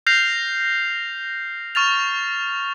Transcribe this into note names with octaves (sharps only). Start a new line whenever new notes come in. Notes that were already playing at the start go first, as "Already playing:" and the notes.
F6 G6 A#6 C7 F7
C#6 F6 A6 F7